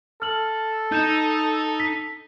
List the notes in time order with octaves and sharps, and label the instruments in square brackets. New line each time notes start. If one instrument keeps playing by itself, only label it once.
[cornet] A4 [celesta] F6 F#7
[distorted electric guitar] D#4 [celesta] G6 E7
[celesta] B6